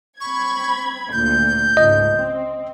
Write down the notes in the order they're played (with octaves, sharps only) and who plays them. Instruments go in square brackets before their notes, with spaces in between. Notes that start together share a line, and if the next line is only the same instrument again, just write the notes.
[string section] C4 B5 G#6 [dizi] C#6
[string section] D2 A#2 [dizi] G6
[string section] C#2 G#2 [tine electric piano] D#5
[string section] C4